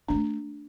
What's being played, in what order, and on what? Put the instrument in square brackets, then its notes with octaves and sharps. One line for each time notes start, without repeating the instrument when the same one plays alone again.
[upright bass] C4 [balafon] D4
[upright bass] A3